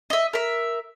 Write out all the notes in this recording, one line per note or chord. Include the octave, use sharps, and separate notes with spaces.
D#5 E5
A#4 E5